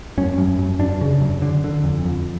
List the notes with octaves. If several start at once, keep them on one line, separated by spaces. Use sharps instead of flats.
F#2 C#4
F#2
F#2
F#2 D4
C#3
F#2
D3
D3
F2
F2